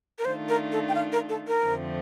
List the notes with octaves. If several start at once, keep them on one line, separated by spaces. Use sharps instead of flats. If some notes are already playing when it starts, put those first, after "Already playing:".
A#4
D#3 A3 D4 F4 C5
A#4
A4
G5
F5
A#4
A4
A#4
F2 D3 F3 A3 C4